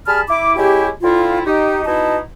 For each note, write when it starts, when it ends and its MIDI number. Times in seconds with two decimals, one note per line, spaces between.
0.07 0.21 55
0.07 0.21 68
0.07 0.21 81
0.07 0.21 83
0.07 0.21 89
0.29 0.55 64
0.29 0.55 86
0.57 0.88 56
0.57 0.88 61
0.57 0.88 64
0.57 0.88 67
1.03 1.41 50
1.03 1.41 60
1.03 1.41 64
1.03 1.41 65
1.46 1.82 63
1.46 1.82 67
1.86 2.18 59
1.86 2.18 63
1.86 2.18 64
1.86 2.18 66
1.86 2.18 75
1.86 2.18 81